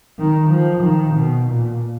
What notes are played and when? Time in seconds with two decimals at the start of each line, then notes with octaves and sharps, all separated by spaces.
0.19 D#3
0.50 F3
0.83 D#3
1.15 B2
1.46 A#2